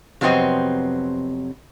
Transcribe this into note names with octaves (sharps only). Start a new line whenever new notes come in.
F2 C3 F#3 B3 C4 D#5